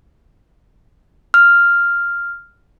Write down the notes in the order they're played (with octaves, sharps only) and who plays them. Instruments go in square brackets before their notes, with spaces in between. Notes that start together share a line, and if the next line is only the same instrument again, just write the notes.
[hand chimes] F6